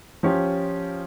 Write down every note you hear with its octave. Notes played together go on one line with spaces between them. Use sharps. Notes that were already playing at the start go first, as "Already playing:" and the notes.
F3 C#4 G4